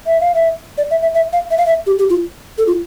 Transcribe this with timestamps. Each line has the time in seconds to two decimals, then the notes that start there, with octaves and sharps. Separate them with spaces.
0.06 E5
0.21 F5
0.35 E5
0.78 D5
0.91 E5
1.02 E5
1.15 E5
1.33 F5
1.51 E5
1.58 F5
1.66 E5
1.87 G4
1.99 G4
2.10 F4
2.58 A4
2.67 F4